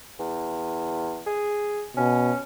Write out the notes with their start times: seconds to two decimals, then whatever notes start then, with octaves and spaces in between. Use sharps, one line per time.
0.20 E2
1.26 G#4
1.97 B2 C#4